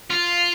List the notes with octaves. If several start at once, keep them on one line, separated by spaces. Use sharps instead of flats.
F4